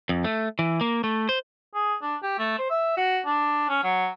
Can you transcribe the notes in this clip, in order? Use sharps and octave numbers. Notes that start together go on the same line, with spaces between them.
F2
A3
E3
A#3
A3
C5
G#4
D4
G4
A3
C5
E5
F#4
D4
C#4
F#3